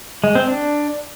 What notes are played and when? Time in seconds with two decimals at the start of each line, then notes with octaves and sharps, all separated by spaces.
0.24 G#3
0.35 C4
0.47 D4